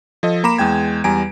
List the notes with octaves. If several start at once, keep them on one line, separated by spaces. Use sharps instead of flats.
F3 A4 D#5
A#3 A#5 B5 D6 E7
E2 G#3 G5 G#6
E2 G3 G#5 A#5 D7